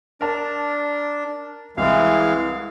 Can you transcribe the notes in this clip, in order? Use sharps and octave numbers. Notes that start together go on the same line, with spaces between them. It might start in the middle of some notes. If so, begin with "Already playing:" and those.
D4 A#4 A5
C2 E3 G#3 F5